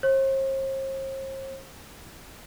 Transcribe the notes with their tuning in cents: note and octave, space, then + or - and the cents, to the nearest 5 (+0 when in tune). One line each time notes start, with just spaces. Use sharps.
C5 +45